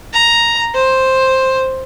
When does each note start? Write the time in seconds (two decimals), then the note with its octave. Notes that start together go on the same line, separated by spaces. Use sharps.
0.13 A#5
0.74 C5